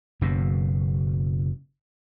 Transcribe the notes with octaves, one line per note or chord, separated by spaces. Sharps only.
F#1 F#2 B2